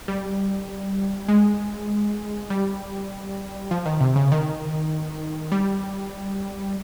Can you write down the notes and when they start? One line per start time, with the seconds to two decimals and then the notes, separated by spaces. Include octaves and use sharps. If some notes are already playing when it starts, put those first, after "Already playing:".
0.08 G3
1.28 G#3
2.50 G3
3.71 F3
3.86 D#3
4.01 C3
4.16 C#3
4.32 D#3
5.52 G3